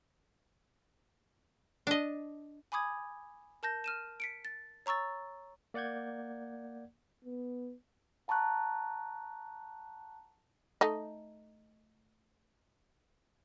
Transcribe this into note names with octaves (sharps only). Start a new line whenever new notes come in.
D4 D#5
G#5 B5 D6 D#6 G#6
A#4 A5 G6 A#6
F6 D#7 E7
B6 C#7 D7
A6
C#5 A#5 C#6 E6 A6
A#3 D5 F#5 G6 G#6
B3
F#5 A5 A#5 C#6 F#6
A3 D#4 D#5